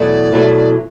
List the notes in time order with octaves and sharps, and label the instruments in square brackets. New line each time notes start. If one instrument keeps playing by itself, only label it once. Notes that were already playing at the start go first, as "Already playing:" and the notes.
Already playing: [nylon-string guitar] E2 B2 F#3 A3 [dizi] D5
[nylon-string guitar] E2 B2 F#3 A3